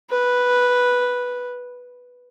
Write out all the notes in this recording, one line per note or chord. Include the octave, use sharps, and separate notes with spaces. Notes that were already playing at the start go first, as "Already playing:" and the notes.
B4